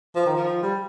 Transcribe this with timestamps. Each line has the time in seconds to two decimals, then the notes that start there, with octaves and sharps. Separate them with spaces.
0.16 F3
0.26 D#3
0.36 F3
0.63 G3